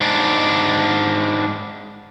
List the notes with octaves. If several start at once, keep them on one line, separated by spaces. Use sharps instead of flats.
G#2 D4